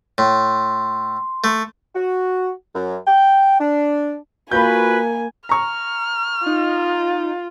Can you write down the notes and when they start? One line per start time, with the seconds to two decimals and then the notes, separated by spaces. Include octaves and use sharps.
0.18 A2 C6
1.44 A3
1.95 F#4
2.74 F#2
3.07 G5
3.60 D4
4.51 A#3 F4 F#4 B4 G#5 B5 G6
5.49 A#5 C#6 F6
6.46 D#4 F4